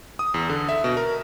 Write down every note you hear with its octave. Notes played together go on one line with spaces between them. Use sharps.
D#6
E2
D3
E5
B2
A#4